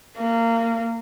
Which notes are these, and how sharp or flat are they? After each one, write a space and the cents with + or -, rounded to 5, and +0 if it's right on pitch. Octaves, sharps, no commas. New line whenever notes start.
A#3 -25